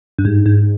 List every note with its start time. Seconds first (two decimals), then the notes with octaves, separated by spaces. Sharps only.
0.18 G2
0.25 G#2
0.46 G#2